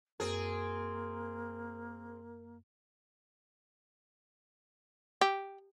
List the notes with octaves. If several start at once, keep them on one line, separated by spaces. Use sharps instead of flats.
F#2 A#3 C4 G#4 A#4
G4